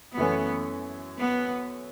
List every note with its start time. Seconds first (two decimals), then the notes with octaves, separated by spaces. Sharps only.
0.17 F#2 E3 A3 B3 C#4
1.20 B3